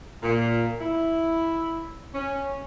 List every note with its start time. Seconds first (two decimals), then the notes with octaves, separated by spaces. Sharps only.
0.23 A#2
0.81 E4
2.14 C#4